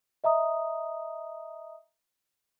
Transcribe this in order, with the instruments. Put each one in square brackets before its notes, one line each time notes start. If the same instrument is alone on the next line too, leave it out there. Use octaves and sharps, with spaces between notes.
[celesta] D#5 E5 A#5 D#6